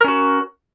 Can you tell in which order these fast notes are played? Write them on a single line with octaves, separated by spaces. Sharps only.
A#4 C#4 F#4